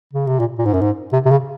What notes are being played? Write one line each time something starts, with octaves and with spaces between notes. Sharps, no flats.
C#3
C3
A#2
A#2
G#2
F#2
G#2
C3
C3
C#3